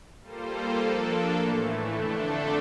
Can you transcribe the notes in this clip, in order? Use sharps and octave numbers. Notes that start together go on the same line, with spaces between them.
G3 A#3 F4 A4 C5
F3 A#3 D4 A4
A2 E3 A3
F2 D3 A3 D4 A4